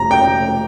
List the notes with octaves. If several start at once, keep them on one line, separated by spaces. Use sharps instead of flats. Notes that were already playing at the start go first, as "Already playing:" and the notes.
Already playing: F1 A#5
G5